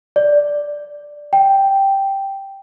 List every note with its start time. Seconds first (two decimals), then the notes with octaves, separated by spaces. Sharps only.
0.16 D5
1.33 G5